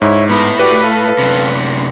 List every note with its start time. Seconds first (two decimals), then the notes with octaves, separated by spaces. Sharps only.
0.02 G#2 E4 C#5
0.29 A2 A3 B3
0.59 F#4 G4 B4 D5
0.83 A4 F5
1.19 F#2 C3